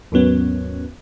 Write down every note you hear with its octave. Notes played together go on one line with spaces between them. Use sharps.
D#2 G#2 F#3 B3 C#4